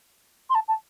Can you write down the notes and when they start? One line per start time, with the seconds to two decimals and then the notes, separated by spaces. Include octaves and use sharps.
0.49 C6
0.54 A5
0.68 A5